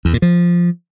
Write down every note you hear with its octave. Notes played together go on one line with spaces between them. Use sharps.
E2
A#2
F3